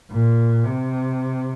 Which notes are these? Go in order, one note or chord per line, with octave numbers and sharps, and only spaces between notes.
A#2
C3